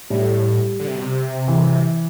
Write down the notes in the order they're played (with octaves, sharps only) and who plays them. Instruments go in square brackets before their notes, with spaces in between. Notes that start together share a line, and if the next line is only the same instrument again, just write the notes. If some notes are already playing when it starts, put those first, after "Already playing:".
[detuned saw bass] A2 [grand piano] G3
[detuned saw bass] D3
C3
B2
C3
[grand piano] E3